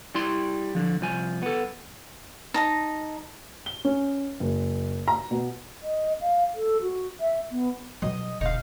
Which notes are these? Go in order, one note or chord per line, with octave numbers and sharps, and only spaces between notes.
G3 E4 D5 C6
D3 F3
C2 F3 G#5
B3 A4
D#4 A5 A#5
G7
C#4
F#1
A#5
B2
D#5
F5
A4
F#4
E5
B3
B2 F#3 G3 D#5
E1 D2 B2 D#4 F5